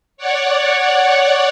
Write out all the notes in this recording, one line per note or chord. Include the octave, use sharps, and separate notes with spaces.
C#5 D5 F#5